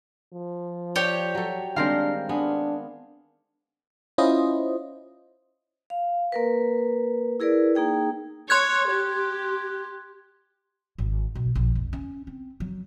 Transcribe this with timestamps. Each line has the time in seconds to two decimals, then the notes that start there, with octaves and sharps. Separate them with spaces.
0.33 F3
0.96 G4 C#5 D5
1.35 F#3 A4
1.76 D#3 G3 G#3 C4 D4 A#4 F5
2.29 B3 D4 G#4
4.18 C#4 E4 F4 C5 D#5
5.90 F5
6.32 A#3 A#4 B4
7.40 E4 G#4 A#4 B4 D5
7.75 A#3 D#4 G#4 G5
8.50 C#5 C6 F#6 G#6
8.89 G4
10.98 G#1
11.35 B1
11.55 A#1
11.75 F1
11.93 C#4
12.27 C4
12.60 F#3